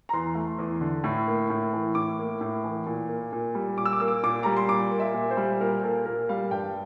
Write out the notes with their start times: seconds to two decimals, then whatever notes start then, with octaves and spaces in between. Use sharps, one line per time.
0.09 A#5
0.13 E2 C6
0.35 A3
0.59 E2
0.81 D3
1.04 A2
1.28 A#3
1.50 A2
1.73 E3
1.95 A2 D6
2.19 A#3
2.41 A2
2.64 E3
2.87 A#2
3.09 A#3
3.33 A#2
3.55 G3
3.77 A#2 D6
3.86 E6
3.93 D6
4.00 A#3 E6
4.08 D6
4.24 A#2 D6
4.43 G3 A#5
4.57 C6
4.69 A#2 D6
4.91 A#3
5.00 E5
5.14 A#2
5.31 C5
5.37 G3
5.61 A#2 A#4
5.84 A#3 A4
6.05 A#2 A#4
6.29 G3 F5
6.51 G2 G5